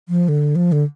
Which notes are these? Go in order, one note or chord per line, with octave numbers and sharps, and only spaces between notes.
F3
D3
F3
D3